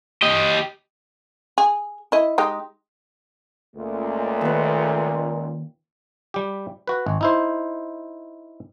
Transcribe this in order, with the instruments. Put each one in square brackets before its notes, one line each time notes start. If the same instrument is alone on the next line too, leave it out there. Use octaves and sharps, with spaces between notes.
[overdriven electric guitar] G4 D#5
[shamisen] G#4
E4 D#5
G#3 D#4 G4
[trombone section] C#2 [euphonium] A#2 [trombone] A3
[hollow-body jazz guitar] D#2 B3
[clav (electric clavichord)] G3 G4
F#4 B4
G#1
D#4 E4 C5